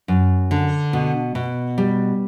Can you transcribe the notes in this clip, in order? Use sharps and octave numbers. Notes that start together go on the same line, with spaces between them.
F#2
D3
B2
B2
G3